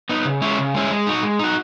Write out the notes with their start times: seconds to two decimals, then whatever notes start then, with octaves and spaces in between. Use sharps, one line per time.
0.09 B3 D#4
0.25 C#3
0.42 G#3 C#4 E4
0.58 C#3
0.74 G#3 C#4 E4
0.91 G#3
1.07 D#4 F#4
1.23 G#3
1.39 D#4 F#4